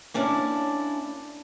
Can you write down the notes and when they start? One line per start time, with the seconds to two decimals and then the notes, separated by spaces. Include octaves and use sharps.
0.14 A#3 C#4 D4 E4